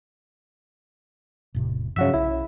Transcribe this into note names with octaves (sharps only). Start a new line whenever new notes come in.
E1 A2 C3
G2 C#3 F3 F#3 F#4 E5
B1 E4